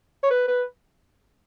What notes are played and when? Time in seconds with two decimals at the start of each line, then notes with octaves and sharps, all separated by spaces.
0.23 C#5
0.31 B4
0.48 B4